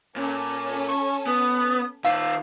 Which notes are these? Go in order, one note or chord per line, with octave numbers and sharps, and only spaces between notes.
A#2 C#4 A4
C#6
B3 D#6
D#3 F4 F5 E6 C7